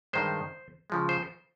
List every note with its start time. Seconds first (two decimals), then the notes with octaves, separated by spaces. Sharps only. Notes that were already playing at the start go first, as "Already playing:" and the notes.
0.13 G2 D#3 G#3 C5
0.90 C#3 F3 G#3
1.09 C5